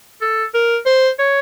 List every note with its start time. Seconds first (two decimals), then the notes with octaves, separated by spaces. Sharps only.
0.22 A4
0.54 A#4
0.86 C5
1.19 C#5